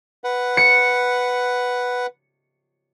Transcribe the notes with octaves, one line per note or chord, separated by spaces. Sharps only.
B4 F#5
C#7